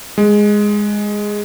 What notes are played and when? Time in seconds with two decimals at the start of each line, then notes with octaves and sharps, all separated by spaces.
0.18 G#3